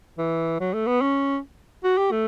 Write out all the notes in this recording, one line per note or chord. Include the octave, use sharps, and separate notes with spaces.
E3
F#3
A3
B3
C#4
F#4
G4
A3